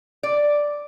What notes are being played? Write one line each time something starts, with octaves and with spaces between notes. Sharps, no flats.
D5